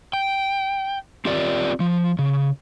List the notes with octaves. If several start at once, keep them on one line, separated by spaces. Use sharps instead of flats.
G5
C4 F4 G4 A#4 D5
F3
C#3